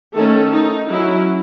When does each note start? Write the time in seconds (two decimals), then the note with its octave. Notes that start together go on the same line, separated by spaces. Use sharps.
0.14 D#3 A3 C#4 A4
0.53 D#4
0.90 F#3 C#4 E4